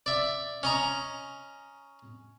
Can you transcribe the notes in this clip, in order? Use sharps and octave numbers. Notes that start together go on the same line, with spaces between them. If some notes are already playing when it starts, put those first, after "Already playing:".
D5 E5
C#4 D#5 A#5